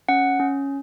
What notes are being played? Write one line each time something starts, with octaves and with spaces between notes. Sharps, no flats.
C#4 F#5
C#4